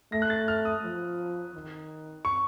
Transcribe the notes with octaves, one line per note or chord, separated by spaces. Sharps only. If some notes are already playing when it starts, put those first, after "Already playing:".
A3 A#6
F#6
A6
F6
D#6
F3
D#3
C#6